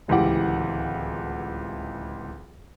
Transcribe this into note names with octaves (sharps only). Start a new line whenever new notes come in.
D1 C#2 E3 G4 F#5